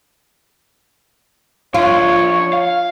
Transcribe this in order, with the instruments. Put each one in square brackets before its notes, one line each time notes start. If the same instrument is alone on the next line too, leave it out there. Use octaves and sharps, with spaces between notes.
[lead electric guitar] F3 D4 [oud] F4 [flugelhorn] C#5
[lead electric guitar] F5